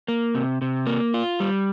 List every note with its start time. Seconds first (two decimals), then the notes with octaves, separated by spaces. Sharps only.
0.08 A#3
0.35 C3
0.62 C3
0.87 A#3
1.14 F4
1.40 G3